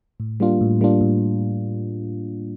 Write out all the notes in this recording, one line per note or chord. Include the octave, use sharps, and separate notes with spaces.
A2
G3 A#3 D4 F4
A2
G3 A#3 D4 F4
A2